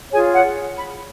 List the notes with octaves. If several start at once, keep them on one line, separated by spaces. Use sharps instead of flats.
F4 G#4 C#5 G#5
F#5
B5